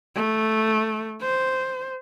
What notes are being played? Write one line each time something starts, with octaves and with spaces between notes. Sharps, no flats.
A3
C5